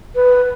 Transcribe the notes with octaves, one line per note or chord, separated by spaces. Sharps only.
B4